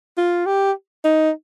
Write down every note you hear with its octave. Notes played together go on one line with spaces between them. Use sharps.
F4
G4
D#4